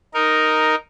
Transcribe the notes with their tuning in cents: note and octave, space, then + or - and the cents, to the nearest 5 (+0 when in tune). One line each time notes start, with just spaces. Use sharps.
D#4 +0 A#4 +0